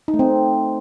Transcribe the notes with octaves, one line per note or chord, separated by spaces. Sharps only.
D#4
A3
C4